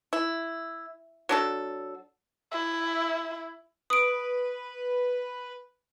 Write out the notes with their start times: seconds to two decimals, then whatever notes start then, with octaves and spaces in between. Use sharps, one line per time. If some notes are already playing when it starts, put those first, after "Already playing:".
0.13 E4
1.29 F#3 D4 A4
2.51 E4
3.90 B4 D#6 D7